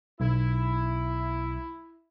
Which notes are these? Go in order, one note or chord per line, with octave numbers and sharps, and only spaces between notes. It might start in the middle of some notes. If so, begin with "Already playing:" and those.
B1 E4